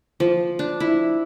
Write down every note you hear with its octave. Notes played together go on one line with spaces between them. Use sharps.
F3
D4
E4